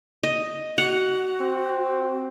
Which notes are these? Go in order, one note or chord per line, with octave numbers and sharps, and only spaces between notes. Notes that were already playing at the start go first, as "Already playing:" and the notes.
D#5
F#4 F#5
C4